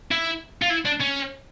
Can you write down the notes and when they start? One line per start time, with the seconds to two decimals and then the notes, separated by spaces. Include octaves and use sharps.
0.11 E4
0.62 F4
0.70 E4
0.86 D4
1.01 C#4